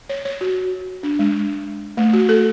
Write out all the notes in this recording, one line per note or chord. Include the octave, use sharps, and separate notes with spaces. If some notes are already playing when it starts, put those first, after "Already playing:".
C#5
C#5
F#4
D4
G#3
A3
F#4
A4